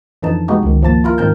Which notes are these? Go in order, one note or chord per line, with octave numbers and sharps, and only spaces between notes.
F2 D3 E3 F3 D#4 A5
B2 G#3 B3 D#4 F#4 G4
C#2 D#3
G1 F3 A#3 A5 A6
E4 F4 A#4
G#2 D#3 C4 A#4 A5 G6